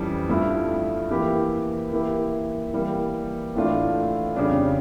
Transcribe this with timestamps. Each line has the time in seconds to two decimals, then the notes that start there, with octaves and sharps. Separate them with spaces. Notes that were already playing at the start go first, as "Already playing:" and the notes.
Already playing: F2 E3 G3 C#4
0.29 G2 F3 A3 E4
1.11 E3 A#3 E4 G4
1.92 E3 A#3 E4 G4
2.73 E3 G3 A#3
3.55 A2 E3 A3 D4 F4
4.36 F2 C#3 G3 D4